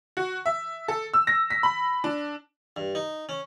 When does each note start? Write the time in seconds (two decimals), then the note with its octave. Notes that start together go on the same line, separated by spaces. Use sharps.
0.17 F#4
0.46 E5
0.88 A4
1.14 E6
1.27 A#6
1.50 B6
1.63 B5
2.04 D4
2.76 G2
2.95 D#4
3.29 C#4